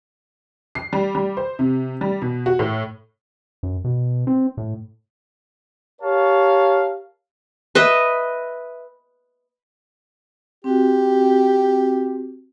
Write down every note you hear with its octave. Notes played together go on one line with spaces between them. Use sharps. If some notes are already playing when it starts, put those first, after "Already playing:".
C7
G3
G3
C5
C3
G3
B2
F#4
A2
F#2
B2
C4
A2
G4 A#4 C#5 F5 A5
B4 D#5 E5
C4 F#4 G4